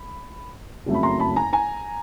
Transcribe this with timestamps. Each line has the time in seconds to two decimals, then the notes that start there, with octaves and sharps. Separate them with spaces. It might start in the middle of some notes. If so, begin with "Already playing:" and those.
Already playing: B5
0.86 F#1 F2 C#3 F#3 A3
0.94 B5
1.03 A#5 C6
1.20 A5 B5
1.36 G#5 A#5
1.53 G#5 A#5